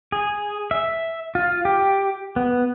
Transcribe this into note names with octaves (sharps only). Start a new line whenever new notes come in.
G#4
E5
F4
G4
B3